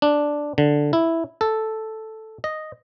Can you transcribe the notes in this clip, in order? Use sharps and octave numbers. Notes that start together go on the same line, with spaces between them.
D4
D3
E4
A4
D#5